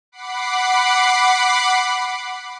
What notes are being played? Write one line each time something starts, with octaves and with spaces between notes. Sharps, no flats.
F#5 B5 D6 C7